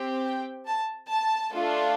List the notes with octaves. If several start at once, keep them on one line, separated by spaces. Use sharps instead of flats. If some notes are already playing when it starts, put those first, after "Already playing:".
Already playing: C4 G4
G5
A5
A5
A3 D4 F4 A4